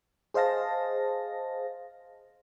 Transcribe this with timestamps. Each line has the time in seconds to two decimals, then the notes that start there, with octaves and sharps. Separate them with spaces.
0.34 G#4 C5 D#5 F5 A5 A#6